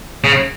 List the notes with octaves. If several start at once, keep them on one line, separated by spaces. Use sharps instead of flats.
C#3